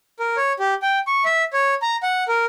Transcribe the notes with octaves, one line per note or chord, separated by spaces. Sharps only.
A#4
C#5
G4
G5
C#6
E5
C#5
A#5
F#5
A#4